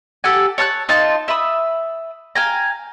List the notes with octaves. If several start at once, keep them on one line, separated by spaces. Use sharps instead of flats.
G4 A4 F#5 G#5
C#5 A5 F6 F#6
D#4 F4 A5 C6
E5 B5 D#6
F5 G5 G#5 A#5